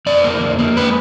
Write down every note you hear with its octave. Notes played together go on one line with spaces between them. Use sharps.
F2 D5
A#3
F2
A#3
G#3 B4